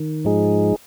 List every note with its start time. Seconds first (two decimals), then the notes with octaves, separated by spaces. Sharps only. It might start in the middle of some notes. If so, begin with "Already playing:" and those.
Already playing: D#3
0.25 G#2 F3 G#3 D#4 G#4